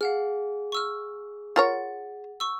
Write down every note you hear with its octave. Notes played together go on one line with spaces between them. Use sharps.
G#4 F5 F#5 F6
C#6 E6 F6
F4 A#4 C#5 F#5 A6
C#6 E6